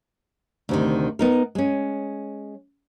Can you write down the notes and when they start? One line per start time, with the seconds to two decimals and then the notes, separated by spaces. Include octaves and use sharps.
0.69 D2 C3 D#3
1.19 B3 D#4 A#4
1.55 G#3 C#4